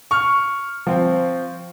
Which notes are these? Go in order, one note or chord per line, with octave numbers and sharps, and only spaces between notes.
C#6 F6
F3 C4